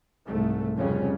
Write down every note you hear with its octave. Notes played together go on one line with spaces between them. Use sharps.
C2 G#2 A3
F1 F2 C#3 G3 C#4